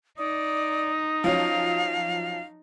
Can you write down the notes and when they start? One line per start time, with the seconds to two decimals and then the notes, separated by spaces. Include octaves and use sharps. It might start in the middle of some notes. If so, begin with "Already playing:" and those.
0.18 D#4 D5 D#6
1.24 F3 F#3 C#4 F5